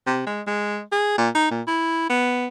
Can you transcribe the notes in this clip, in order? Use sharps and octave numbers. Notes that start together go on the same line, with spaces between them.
C3
G#3
G#3
G#4
A#2
D#4
A#2
E4
B3